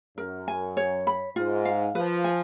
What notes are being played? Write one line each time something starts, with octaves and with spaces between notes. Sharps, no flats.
F#2 A#4
G#5
C#5
B5
G#2 F4
F5
F3 B4
G#5